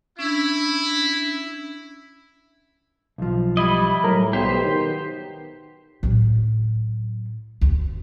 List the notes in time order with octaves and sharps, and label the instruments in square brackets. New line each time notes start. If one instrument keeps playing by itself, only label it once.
[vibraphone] C#4 D4 [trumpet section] E4
[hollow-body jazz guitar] B1 F3
[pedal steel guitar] G3 E4 D#5
[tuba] A2 [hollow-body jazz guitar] F#3 A#4 A#5
[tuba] B1 [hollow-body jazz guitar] B3 [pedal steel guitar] G4 C5
[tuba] D#3
[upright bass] A2 F#3
D2